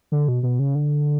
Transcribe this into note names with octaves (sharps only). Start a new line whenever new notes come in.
D3
B2
B2
C#3
D3